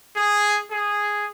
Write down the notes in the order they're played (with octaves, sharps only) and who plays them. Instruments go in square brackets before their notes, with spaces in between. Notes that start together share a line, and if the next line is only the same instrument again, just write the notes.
[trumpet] G#4
G#4